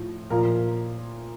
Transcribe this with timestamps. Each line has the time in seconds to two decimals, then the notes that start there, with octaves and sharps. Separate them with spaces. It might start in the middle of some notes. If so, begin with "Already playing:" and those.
Already playing: A2 F3
0.30 A#2 F3 A#4